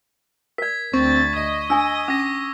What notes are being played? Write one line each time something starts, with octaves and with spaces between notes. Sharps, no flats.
A#4 D5 G#6 B6
D2 C4 C#6 A6
D#5 D#6
D4 G#5 E6
C#4 D6 A#6